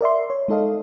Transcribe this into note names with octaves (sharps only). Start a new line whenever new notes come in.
A#4 D5 E5 C6
C#5
G#3 D#4 A4 D#5 F5